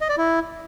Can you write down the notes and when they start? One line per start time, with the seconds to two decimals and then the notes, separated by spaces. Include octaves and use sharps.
0.01 D#5
0.09 D5
0.18 E4